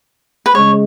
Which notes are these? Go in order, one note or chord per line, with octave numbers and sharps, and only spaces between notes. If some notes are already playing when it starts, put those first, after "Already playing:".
B4
C#3 G#3 C#5